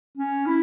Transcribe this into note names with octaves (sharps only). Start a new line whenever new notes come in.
C#4
E4